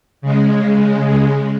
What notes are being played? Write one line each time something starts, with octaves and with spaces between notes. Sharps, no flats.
C#3 G#3